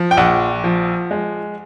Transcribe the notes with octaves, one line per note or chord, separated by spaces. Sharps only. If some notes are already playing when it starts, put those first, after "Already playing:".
Already playing: F3
G5
A#1 F#5
F3
G#3